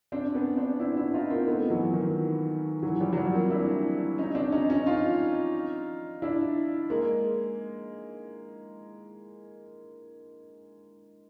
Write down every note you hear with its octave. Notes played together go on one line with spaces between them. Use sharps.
C4 D4
B3 C#4
C4 D4
D4 E4
D4 E4
D#4 F4
A#3 C4
A3 B3
E3 F#3
D#3 F3
E3 F#3
F3 G3
F#3
F3 G3
A#3 C4
D4 E4
C#4 D#4
C4 D4
C#4 D#4
C#4 D#4
D#4 F4
D4 E4
G#3 A#3